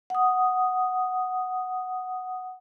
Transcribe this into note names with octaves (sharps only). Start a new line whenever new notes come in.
F#5 D#6